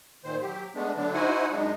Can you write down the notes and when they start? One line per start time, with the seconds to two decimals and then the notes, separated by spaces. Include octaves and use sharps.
0.24 A#2 D#3 C5
0.41 F#3 G4
0.75 G#3 A3 B3 D4
0.97 D3 F#3 D4
1.13 D#4 E4 F#4 C5 F#5 G#5
1.51 F#2 G#3 D4 D#4